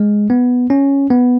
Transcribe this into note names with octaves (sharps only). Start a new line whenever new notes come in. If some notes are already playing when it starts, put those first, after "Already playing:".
Already playing: G#3
B3
C#4
B3